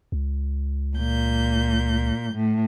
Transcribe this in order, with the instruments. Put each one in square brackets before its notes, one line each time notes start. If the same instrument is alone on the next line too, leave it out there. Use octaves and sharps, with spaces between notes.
[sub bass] C#2
[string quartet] A#2 G6
A2